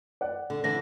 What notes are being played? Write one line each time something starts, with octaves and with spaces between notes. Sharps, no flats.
D5 F#5
D3
D3 E3 A#6